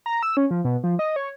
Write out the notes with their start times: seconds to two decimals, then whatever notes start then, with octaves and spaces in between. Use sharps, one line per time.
0.06 A#5
0.23 E6
0.37 C#4
0.51 F3
0.65 B2
0.84 F3
0.99 D#5
1.16 C#5